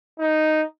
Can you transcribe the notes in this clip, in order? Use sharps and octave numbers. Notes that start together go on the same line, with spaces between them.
D#4